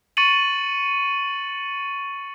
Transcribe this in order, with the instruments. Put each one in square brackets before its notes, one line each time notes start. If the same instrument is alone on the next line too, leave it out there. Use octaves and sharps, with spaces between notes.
[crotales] C#6 A6 C#7 D#7 F#7